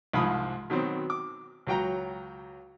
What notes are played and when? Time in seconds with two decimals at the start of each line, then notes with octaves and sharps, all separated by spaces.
0.13 C2 G#2 F3 B5 D#6
0.70 B2 D#3 F#3 C4
1.10 D6
1.67 C#2 F#3 G5 A#5